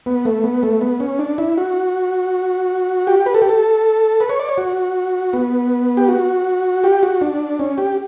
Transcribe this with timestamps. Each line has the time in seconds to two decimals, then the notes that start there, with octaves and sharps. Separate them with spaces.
0.06 B3
0.25 A3
0.44 B3
0.63 A3
0.81 B3
1.00 C#4
1.19 D4
1.38 E4
1.58 F#4
3.07 G4
3.26 B4
3.34 A4
3.42 G4
3.49 A4
4.21 B4
4.29 C#5
4.40 D5
4.49 C#5
4.58 F#4
5.33 B3
5.97 G4
6.09 F#4
6.84 G4
7.03 F#4
7.21 D4
7.59 C#4
7.78 G4